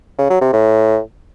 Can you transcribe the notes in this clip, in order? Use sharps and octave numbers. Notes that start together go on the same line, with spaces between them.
C#3
F#3
C3
A2